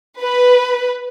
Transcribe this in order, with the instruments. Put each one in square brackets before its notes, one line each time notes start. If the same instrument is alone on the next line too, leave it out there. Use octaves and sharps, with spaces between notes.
[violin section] B4